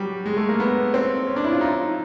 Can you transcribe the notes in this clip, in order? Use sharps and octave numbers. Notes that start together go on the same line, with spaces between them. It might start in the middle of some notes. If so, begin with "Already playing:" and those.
Already playing: F#3 G3
G#3
A3
A#3
B3
C4
C#4
D4
E4
F4
D#4